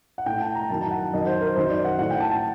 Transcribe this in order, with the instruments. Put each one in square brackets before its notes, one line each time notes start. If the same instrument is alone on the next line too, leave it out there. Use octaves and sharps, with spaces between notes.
[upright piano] F#5
A2 G5
A5
A#5
F#2 D#3 A5
A5
F#5
F#2 D#3 D#5
C5
A#4
F#2 D#3 C5
D5
F#5
A2 F#5
G5
A5
A5